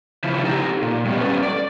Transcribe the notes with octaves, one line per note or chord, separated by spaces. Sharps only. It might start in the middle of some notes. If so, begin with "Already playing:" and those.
C#3 F3 E4
D#4 G4 A4 A#5
A#2
G2 B2
G3 C#4 A4 B4
D5